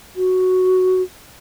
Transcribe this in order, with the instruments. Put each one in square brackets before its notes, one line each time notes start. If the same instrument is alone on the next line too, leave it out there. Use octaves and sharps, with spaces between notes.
[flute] F#4